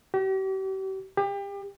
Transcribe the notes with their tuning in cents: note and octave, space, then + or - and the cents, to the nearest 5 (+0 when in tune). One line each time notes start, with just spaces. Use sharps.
G4 -40
G4 +30